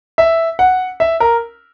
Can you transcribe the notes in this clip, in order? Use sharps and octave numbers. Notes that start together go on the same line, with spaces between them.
E5
F#5
E5
A#4